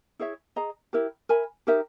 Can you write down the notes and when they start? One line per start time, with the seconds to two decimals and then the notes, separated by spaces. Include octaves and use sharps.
0.19 E4 G#4 C#5 E5
0.56 G#4 D#5 A#5
0.93 E4 G4 A#4
1.29 A#4 E5 G#5 B5
1.67 D#4 G4 A#4 E5